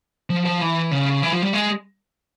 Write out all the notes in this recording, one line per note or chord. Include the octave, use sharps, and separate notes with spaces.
F3
F3
E3
C#3
E3
F3
G3
G#3